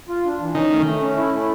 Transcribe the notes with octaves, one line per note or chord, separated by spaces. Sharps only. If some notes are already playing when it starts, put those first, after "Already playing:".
F4
D4
E3
D#3 C#4
A3
A3
C#4
E4
A3